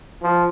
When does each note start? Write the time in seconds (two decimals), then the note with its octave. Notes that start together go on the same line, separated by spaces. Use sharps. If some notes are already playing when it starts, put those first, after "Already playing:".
0.22 F3